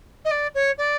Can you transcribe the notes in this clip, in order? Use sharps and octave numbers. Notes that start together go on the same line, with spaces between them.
D#5
D5
C#5
D5